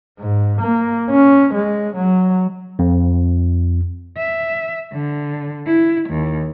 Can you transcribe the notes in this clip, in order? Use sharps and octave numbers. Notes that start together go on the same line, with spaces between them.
G#2
A#3
C#4
G#3
F#3
F2
E5
D3
E4
D#2